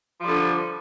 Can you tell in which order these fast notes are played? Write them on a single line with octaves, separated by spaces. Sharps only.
F3 G3 D3